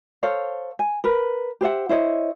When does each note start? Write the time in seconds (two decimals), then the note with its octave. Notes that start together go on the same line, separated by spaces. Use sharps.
0.23 A4 C5 C#5 F5
0.79 G#5
1.04 A#4 B4
1.61 G4 C5 E5 F#5
1.89 E4 C5 C#5 D#5